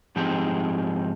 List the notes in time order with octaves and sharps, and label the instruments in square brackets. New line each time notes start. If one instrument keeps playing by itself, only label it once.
[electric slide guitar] G#2 F3 C4 D#4 G4 G#4